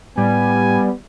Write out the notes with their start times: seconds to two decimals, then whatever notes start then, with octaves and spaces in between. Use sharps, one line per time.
0.17 A2 G3 B3 G#5